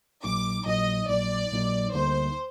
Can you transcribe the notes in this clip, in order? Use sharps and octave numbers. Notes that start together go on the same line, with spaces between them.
A#1 A#2 F#3 A#3 D#4 D6
A#1 A#2 F#3 A#3 D#4 D#5
A#1 A#2 F#3 A#3 D#4 D5
A#1 A#2 F#3 A#3 D#4
D2 D3 G3 A#3 D#4 C5